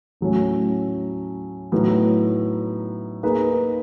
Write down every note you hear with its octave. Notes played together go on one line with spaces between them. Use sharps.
A2 F#3 A3 C#4
A2 F#3 B3 D#4
A#3 D#4 G#4 B4